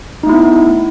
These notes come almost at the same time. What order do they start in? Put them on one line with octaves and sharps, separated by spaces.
D#4 A3 E4 B3